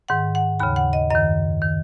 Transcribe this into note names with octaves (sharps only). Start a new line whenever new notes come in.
G#2 D#3 F#5
F#5
D#2 C#3 B5
F#5
D#5
F#2 D#3 D#5
D#3